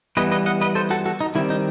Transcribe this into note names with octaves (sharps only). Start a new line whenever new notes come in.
E3 G3 B3 B4 D#5
B4 D#5
D#5 F#5
B4 D#5
A4 C5
F#4 A4
F#4 A4
D#4
D#3 G3 C4 E4
D#4